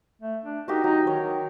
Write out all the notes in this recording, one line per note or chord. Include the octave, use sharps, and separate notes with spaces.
A3
D4
D#4 F#4 G4 A#4
F#3 D#4
D#3 C#5